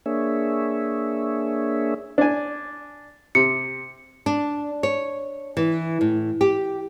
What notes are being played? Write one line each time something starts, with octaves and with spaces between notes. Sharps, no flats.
A#3 D4 G#4 C#5 E5
D4 G#5
C3 C#7
D4
C#5
E3
A2
G4